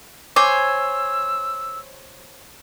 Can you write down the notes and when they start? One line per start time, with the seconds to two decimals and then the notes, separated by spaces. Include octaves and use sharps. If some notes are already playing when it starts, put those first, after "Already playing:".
0.36 C5 C#5 G#5 D6 E6